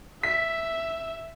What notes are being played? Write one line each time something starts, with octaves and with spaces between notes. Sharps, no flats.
E5 B6